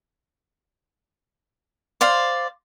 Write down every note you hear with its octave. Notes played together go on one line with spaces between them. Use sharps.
C5 D5 F5